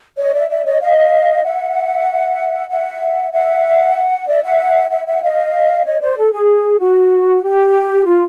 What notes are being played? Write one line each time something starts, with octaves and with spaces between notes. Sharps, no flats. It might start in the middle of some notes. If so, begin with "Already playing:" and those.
C#5 D#5
D5 E5
D5 E5
C#5 D#5
D#5 F5
E5 F#5
E5 F#5
E5 F#5
D5 E5
E5 F#5
E5 F#5
E5 F#5
D#5 F5
C#5 D#5
C5 D5
A4
G#4
F#4
G4
F4